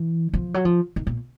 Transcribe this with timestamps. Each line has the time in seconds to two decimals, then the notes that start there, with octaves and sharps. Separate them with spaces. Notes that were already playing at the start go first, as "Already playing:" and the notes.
Already playing: E3
0.34 F3
0.54 F#3
0.65 F3
0.96 D#3
1.07 A#2